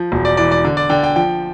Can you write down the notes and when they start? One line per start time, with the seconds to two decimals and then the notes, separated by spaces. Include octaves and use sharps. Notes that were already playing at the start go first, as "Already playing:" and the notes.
Already playing: F3
0.12 E1
0.25 D5
0.37 E3 D5
0.52 D5
0.65 D3
0.77 D5
0.90 D3 G5
1.03 G5
1.16 F3 G5